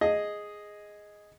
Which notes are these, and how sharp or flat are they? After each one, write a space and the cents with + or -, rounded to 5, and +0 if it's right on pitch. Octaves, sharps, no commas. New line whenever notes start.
G#4 +0 D#5 +0